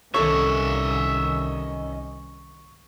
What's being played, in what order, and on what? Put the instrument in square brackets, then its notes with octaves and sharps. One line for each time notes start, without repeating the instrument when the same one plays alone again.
[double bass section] C2 D#3 C#4 [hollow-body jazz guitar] A4 C#5 [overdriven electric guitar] D#5 E5 [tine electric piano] C#6